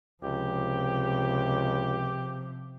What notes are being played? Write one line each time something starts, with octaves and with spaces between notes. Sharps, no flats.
C#2 C3 F3 G4